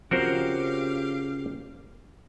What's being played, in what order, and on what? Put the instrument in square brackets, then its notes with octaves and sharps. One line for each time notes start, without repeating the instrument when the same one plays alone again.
[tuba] C#3 [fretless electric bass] F3 C4 [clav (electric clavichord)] F#4 A#4 C5 [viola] G4 F5